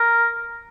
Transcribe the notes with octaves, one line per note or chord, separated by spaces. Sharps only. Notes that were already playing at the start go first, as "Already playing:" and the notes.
Already playing: A#4